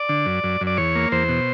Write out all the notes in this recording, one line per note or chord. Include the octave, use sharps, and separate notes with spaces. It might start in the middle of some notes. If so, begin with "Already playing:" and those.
Already playing: D5
D3
F#2
F#2
F#2
D5
E2 C#5
A#3
E2 C5
B2